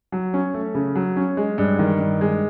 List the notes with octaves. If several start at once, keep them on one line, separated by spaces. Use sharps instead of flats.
F#3
C#4
A3
C#3
F#3
C#4
G#3
G2
D#3
G2
G#3